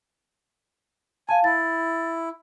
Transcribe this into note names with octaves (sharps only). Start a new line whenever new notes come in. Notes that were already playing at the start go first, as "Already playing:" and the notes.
F5 G#5 A5
E4 A6